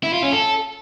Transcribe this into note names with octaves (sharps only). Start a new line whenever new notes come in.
E4
F4
C#4
A4